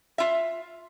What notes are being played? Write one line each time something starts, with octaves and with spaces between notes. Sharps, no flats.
F4 E5